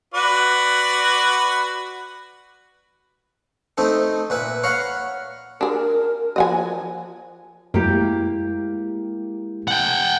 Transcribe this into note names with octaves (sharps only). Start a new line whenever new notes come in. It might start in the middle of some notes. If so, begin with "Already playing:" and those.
F#4 B4 D5
A3 C4 D#4 A4
A#2 B4 E5
C#5 F5 F#5 A#5 B5
D4 G#4 A#4
F3 D#5 F#5 G#5
F#2 G#3 A#3 E4 G4
F#5 G5